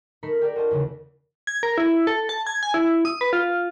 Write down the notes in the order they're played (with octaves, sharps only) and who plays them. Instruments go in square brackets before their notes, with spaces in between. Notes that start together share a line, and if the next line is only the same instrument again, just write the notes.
[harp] A3 D#4 A#4 B5 C7 C#7
D#4 G4 A#4 D5
F#4 C5 D#5 A5
E2 C#3 A3
[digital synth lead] G#6
A#4
E4
A4
A5
G#6
G#5
E4
D#6
B4
F4